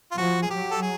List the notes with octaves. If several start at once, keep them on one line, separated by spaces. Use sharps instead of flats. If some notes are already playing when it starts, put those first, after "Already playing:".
F4
F3 F#4
G#4
F#3 G4
A4
G#4